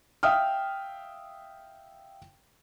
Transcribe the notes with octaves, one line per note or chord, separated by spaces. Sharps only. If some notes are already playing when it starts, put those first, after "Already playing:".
E5 F5 G5 D#6 F6